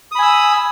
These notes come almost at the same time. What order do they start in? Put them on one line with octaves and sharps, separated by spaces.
D#6 B5 G#5 E6